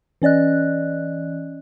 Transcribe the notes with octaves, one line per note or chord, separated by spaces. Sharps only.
E3 C#4 D5 D#5 F#6